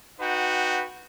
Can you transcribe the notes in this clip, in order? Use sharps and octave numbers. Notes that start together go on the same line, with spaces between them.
D#4 F#4 B4 F#5 G5